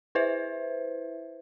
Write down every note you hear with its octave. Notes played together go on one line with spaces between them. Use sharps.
E4 B4 C5 E5